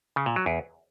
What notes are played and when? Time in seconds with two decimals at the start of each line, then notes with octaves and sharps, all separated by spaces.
0.16 C#3
0.26 A#2
0.36 F#3
0.46 E2